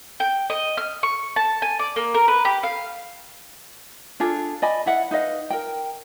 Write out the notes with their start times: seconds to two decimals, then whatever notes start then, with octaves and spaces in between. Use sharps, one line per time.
0.20 G5
0.50 D#5
0.77 F6
1.03 C#6
1.36 A5
1.62 G#5
1.79 D5
1.96 A#3
2.14 A#4
2.28 B4
2.45 G4
2.63 F5
4.20 D4 F4 G#4 A4
4.62 D5 D#5 G#5 B5
4.86 E4 E5 F#5
5.11 D#4 B4 D#5 F5
5.50 A#4 G5